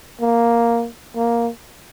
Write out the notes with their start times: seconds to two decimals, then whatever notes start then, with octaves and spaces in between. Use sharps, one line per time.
0.20 A#3
1.16 A#3